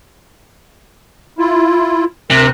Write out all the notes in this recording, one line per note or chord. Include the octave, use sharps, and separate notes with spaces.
E4 F4
D2 C3 A#4 F#6